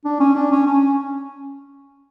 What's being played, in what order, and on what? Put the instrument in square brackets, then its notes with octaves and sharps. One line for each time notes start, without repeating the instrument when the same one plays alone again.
[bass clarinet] D4
C#4
D4
C#4
C#4